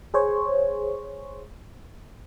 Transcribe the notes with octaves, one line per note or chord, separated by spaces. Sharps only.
G#4 C5 C#5